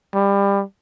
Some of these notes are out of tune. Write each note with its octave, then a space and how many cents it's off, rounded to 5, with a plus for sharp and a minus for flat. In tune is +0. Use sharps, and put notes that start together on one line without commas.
G3 +25